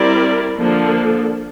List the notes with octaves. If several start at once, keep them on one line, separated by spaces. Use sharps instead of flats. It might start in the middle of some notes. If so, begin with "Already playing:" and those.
Already playing: G3 C4 E4 A#4 D5
D3 F3 A#3 D4 A4